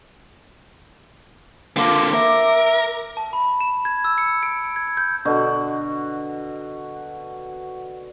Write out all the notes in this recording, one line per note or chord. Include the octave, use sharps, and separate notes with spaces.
D3 A#3 F4 D6
A#4 E5
A5
B5
E7
G#6
E6
C#7
D7
G#6
G6
B2 D3 F#4